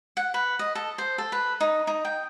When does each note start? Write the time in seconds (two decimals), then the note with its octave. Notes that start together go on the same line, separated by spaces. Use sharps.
0.17 F#5
0.34 B4
0.59 D#5
0.75 A4
0.98 C5
1.18 A4
1.32 B4
1.60 D#4
1.87 D#4
2.05 G5